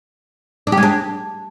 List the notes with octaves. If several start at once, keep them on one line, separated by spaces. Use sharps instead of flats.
D4
G4
G#3
D4